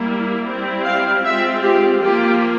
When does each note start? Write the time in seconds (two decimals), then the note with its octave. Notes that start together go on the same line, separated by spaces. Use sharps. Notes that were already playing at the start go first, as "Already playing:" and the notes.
Already playing: G3 A#3 E4
0.44 G3 C4 E4
0.84 F5
1.23 G#3 C4 F4 E5
1.62 G4
2.01 F3 A#3 F4 G4